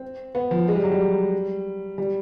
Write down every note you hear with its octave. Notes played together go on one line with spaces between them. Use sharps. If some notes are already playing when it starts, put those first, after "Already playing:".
Already playing: C4
B3
F3
G#3
G3
F#3
G3
G3